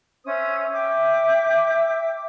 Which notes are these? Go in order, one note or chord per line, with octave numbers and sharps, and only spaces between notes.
C#4 C5 E5 D#6
E5 G5 D6